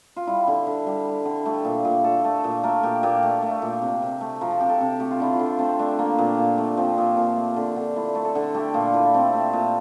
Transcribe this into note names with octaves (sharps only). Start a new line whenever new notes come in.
F4
G3 E4
D3
D3
G3 G4
G3
D3
A3 G4
A#2
A#2
A3 A4
A3
A#2
A3 A#4
A#2 G4
A#2 G4
A3
A3
A#2
C3
C3
A3
F3 A#4
A4
C3 G4
A4
C3
A3 G4
F4
D3 E4
F4
D3
A3 C4
A3 D4
D3 A#3
A#2 C4
A#2
A3
F3 C4
A#2
A#2
A3
D3
D3
A3 E4
A3
A4
D3
A3 G4
A#2 F4
A#2 E4
A3 C4
A3
A#2